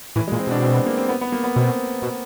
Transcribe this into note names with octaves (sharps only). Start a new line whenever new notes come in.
A2 E3
G#3
A#2
C4
B2 D4
C4
B3
A#3
C4
B3
B3
A#3
B3
B2 C4
B2